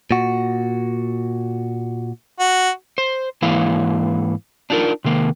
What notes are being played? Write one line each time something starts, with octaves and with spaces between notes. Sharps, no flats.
A#2 F#4
F#4
C5
G#2 E3 A#3 E4 C#5 F5
D4 D#4 F4 A4 A#4
C3 D#3 A#3